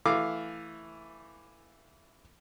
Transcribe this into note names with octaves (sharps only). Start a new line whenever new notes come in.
E3 A3 F5 D6